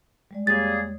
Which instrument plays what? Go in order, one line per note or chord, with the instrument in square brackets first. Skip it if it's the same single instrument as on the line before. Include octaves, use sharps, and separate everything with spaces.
[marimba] G3 G#3 D5
[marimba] E2 C#5 G#6 [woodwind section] G3 A#3 G#4 [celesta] A6